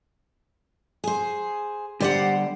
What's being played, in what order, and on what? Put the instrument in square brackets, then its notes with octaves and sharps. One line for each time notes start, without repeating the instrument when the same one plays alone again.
[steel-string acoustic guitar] G#4 C5
[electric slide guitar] D3 G3 D5 [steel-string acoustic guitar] G4 C5 F#5